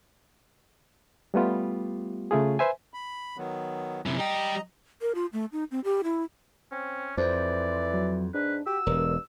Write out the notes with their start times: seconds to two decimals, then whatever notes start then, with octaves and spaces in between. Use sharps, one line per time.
1.34 G3 A3 B3 F4 G4
2.31 C#3 A3 F4 G#4
2.59 B4 C5 E5 G#5
2.94 B5
3.37 D#3 F#3 B3
4.06 F#2 C3 E4
4.18 G3 D#5 G5 A#5
5.01 A#4
5.15 F4
5.33 A3
5.52 D#4
5.71 C4
5.84 G4
6.04 E4
6.72 C4 C#4
7.17 F2 E3 C5 D5
7.93 F#3
8.34 G#2 D4 B4
8.66 F#4 G4 E6
8.86 E1 G2 A#4